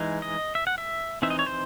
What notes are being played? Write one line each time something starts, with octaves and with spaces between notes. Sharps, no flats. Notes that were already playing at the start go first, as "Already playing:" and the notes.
Already playing: E3 G#3 D#4
D#5
E5
F#5
E5
E3 C4 D#4 E5
D#5
C#5
C5